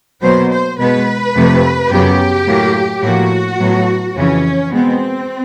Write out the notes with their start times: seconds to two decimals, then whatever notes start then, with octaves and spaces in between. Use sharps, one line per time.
0.22 B2 F#3 A#3 C5
0.51 C5
0.79 B2 G#3 B3 B4
1.35 F2 C3 F3 A3
1.90 F#2 C#3 F#3 B3 G4
2.47 A2 F#3 A#3
3.03 A2 F3 A#3 F#4
3.59 A2 F#3 B3
4.16 F2 C#3 E3 C#4
4.71 B2 G#3 B3 C4